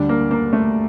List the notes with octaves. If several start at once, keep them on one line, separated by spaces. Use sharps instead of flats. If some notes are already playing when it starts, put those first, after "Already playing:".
Already playing: D2 D3 G3 D4
A#3
A#3
A3